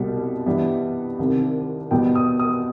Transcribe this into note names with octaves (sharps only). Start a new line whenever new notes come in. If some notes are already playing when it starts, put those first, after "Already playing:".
Already playing: C2 B2 G3
G2 E3 G3 B3
C2 C3 D#3
E2 B2 G3 B3 G5
D#6
D#6